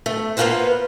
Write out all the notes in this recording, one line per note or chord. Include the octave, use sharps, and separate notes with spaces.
A3
A#3 B3 C#4 F4 B4 C5